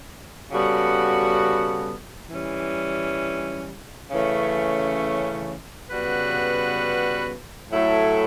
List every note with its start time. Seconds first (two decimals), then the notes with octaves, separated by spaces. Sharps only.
0.50 C#3 G3 B3 F#4 A4
2.30 E3 G3 C#4
4.10 C#3 E3 A3 C#4
5.90 C#3 G3 B3 F#4 B4
7.70 A2 F#3 A3 E4 A4